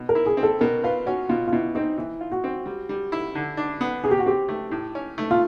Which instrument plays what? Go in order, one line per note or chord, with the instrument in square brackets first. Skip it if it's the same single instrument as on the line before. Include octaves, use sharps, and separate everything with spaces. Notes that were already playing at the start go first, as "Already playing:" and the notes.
Already playing: [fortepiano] B2
[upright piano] A#4
[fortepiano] E4
[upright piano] G#4
[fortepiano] C4
[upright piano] A4
[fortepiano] B2 [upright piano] A#4
[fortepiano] F4 [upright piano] B4
[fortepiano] C#4 [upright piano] F#4
[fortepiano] B2 [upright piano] F4
[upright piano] F4
[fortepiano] B2 [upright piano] E4
[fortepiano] C4 [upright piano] D#4
[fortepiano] E3 [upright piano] E4
[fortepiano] F4
[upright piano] F#4
[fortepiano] C4
G3
G3
E4
D3
D4
B3
[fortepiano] C3 [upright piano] G#4
[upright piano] G4
F#4
[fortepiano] C4 [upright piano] G4
[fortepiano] A3
A2
C#4
A3
[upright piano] F4